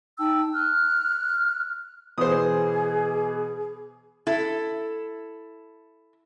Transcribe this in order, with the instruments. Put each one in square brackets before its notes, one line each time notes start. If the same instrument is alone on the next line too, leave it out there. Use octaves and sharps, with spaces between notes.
[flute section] D#4 G5 A5 E6
F6 F#6
[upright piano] B2 E3 [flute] G#4 [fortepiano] C5 D#6
[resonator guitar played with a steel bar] E4 A4